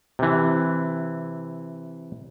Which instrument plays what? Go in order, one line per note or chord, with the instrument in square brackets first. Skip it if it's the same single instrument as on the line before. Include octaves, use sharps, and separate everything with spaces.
[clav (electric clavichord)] C3 E3